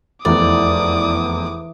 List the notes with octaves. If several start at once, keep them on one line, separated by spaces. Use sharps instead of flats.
F1 E2 E3 D5 D6 D#6